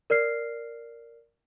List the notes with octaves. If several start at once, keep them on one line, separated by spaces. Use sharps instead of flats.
A#4 D5 F6 C7